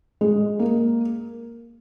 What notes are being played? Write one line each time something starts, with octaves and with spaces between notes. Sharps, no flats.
G#3
A#3